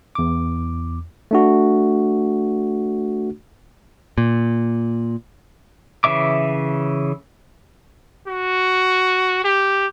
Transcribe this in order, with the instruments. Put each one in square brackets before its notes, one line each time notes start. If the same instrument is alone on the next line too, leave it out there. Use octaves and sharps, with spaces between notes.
[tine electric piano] E2 D6
A3 D4 F#4
[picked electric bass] A#2
[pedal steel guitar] C#3 E3 E5 D6
[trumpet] F#4
G4